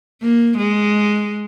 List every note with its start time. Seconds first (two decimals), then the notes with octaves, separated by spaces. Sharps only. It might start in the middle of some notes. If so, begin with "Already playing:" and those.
0.22 A#3
0.58 G#3